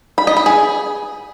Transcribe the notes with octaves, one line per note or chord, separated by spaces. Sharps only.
B5
D#5
B5
G#4